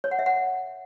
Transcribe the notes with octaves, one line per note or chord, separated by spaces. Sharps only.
C#5
F#5
E5
F#5